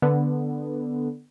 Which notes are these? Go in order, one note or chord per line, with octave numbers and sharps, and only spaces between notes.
D3 B3